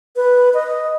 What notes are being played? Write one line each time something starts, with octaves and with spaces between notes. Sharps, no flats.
B4
D#5